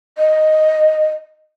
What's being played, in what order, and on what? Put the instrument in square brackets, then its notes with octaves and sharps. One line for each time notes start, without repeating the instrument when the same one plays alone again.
[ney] D#5